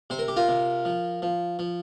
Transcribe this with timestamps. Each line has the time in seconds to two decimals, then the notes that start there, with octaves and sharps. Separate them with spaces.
0.10 C3 C5
0.19 A#4
0.28 G4
0.36 F4 A#4
0.48 C3
0.85 F3
1.22 F3
1.59 F3